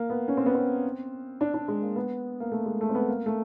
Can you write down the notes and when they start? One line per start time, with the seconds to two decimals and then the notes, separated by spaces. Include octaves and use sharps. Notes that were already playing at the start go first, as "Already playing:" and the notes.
Already playing: A#3
0.10 B3
0.28 C#4
0.37 C4
0.46 B3
0.55 C4
1.41 D4
1.54 D4
1.68 G#3
1.82 A#3
1.96 B3
2.40 A#3
2.52 A3
2.66 G#3
2.81 A3
2.89 C4
2.95 B3
3.09 A#3
3.26 A3